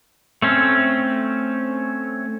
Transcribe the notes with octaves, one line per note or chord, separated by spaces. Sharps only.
A3 C4 C#4